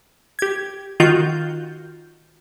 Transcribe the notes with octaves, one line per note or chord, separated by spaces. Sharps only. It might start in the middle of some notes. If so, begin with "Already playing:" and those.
G4 G#6
D#3 F4 F#4 G6